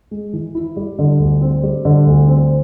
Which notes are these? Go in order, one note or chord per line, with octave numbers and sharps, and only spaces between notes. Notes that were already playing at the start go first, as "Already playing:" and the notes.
G#3
E3
E4
G3
D3
D2
C4
G3
D3
D2
C4